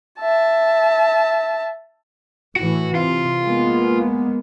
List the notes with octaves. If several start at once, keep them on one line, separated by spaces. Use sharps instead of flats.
E5 A5
A2 E3 F#4
C3 F4
G#3 A#3 B3